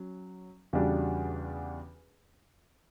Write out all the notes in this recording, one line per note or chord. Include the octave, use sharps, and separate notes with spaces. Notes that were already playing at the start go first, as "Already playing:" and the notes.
Already playing: F#3 C#4
E2 C#3 G3 D4 F#4